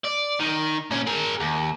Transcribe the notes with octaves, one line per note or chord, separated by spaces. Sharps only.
D5
D#3
A#2 C#4
G#4 A#4
D#2